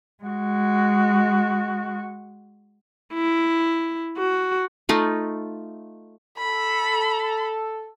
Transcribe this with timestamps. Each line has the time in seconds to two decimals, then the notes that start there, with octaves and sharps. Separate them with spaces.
0.24 G#3 F#4
3.14 E4
4.18 F#4
4.89 A3 D#4 F4
6.38 A4 B5